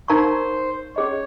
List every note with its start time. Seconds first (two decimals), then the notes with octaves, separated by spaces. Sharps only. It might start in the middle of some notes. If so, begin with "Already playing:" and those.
0.08 D#4 A#4 C5 F5 A#5 C#6
0.96 C#4 G#4 C#5 D#5